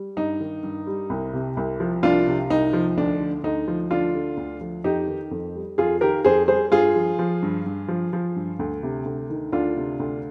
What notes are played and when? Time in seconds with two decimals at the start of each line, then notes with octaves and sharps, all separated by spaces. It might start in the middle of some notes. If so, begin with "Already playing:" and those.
Already playing: G3
0.17 G2 D#4
0.40 D#3
0.63 G2
0.87 G3
1.10 C2
1.34 C3
1.57 C2
1.80 F3
2.03 C2 D4 F4
2.28 C3
2.50 C2 D#4
2.73 F3
2.97 D2 D4
3.21 D3
3.44 D2 D#4
3.68 F3
3.91 D2 D4 F4
4.15 D3
4.37 D2
4.61 F3
4.84 F2 D#4 G4
5.07 D#3
5.31 F2
5.55 G3
5.78 F2 F4 G#4
6.01 D#3 G4 A#4
6.25 F2 G#4 C5
6.48 G3 G#4 C5
6.72 G2 F4 G#4
6.95 F3
7.19 F3
7.43 G2
7.66 G2
7.88 F3
8.13 F3
8.36 G2
8.59 D2
8.83 C3
9.05 D2
9.30 D#3
9.52 D2 D4 F4
9.77 C3
10.00 D2